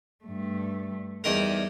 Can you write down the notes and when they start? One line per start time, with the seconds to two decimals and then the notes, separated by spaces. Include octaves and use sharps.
0.25 G2 A3
1.24 E2 G3 D#4 A#4